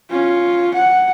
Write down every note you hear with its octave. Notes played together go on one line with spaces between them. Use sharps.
C#4 F4
F#5